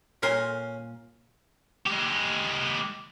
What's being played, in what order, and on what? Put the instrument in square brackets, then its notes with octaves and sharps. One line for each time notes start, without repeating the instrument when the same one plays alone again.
[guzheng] A#2 A#4 C6 [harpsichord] C#4
[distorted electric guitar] G#3 G4